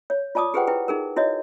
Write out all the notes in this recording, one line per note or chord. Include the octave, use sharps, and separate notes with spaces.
C#5
F4 D5 A5 D6 D#6
G4 G#4 B4 C5 F#5 G5
E4 B4 G5
D#4 G#4 A#4
E4 F#4 C#5 D#5